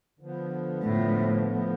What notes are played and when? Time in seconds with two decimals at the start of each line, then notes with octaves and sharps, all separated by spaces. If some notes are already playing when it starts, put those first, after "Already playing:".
0.19 D3 F3 B3
0.83 A2 D3 F3 B3
1.45 D3 F3 B3